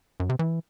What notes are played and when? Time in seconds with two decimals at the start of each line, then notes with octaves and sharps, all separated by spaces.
0.20 F#2
0.29 C3
0.39 E3